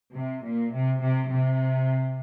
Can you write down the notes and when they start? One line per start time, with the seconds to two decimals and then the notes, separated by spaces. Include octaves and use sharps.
0.14 C3
0.44 A#2
0.73 C3
1.01 C3
1.29 C3